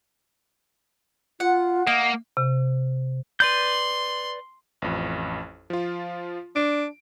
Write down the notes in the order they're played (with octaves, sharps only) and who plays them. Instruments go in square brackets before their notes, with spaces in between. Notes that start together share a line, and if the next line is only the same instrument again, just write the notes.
[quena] F4 [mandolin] F#5
[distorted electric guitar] A#3 [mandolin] D#5 [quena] F#5
[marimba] C3
[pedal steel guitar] B4 D5 G6 [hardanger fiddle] C6
[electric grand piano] A1 F2
F3 F4
[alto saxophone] D4 [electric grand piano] D7